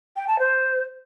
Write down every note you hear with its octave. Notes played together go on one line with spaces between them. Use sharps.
G5
A5
C5